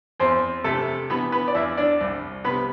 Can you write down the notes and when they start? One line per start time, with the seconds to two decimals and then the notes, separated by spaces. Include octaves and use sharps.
0.20 E2 C4 C5
0.64 C3 A3 A4
1.10 E3 B3 B4
1.32 B3 B4
1.48 D5
1.54 E2 E4 E5
1.77 D4 D5
2.01 C2
2.44 C3 B3 B4